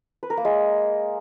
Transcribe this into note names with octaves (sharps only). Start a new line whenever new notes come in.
B4
A#4
A#3
G#3